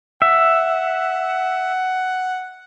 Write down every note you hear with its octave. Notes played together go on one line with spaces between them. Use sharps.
E5 F#5